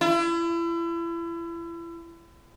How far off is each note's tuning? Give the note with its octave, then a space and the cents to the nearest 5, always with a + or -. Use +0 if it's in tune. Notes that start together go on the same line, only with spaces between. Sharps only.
E4 +35